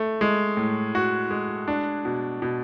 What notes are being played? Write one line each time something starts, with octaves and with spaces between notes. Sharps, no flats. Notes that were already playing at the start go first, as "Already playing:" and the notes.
Already playing: A3
G#3
A2
F#4
G#3
D4
B2
B2